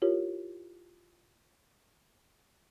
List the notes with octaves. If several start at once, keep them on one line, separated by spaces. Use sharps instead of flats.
E4 F4 G4 A#4 C#5